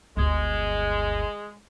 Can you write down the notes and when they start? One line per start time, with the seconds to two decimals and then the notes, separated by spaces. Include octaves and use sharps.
0.17 G1 D2 G#3